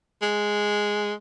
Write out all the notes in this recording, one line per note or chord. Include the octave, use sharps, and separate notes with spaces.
G#3